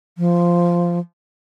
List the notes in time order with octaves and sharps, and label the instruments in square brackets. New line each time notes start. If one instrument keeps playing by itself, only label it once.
[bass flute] F3